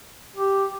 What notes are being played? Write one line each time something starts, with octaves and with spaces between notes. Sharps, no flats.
G4